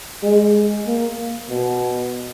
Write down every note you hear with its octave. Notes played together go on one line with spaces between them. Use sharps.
G#3
A#3
B2